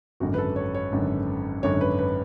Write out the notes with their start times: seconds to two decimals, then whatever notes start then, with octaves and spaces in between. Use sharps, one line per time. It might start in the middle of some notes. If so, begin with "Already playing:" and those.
0.20 G#1 F#2 D3 F#4
0.34 B4
0.38 A4
0.56 C#5
0.75 C#5
0.92 G#1 F#2 D3
1.63 G#1 F#2 D3 C#5
1.81 B4
1.99 B4